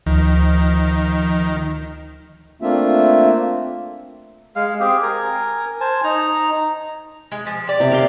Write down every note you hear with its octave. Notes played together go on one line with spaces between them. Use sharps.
D2 D#3 F3
A3 A#3 C4 D4 F4 E5
G#3 F5
C4 G4 G#4
A#4 G#5
C5 G#5 A5
D#4 A#5
G#3
F3
G4 D5
C3
A#4 F5 C6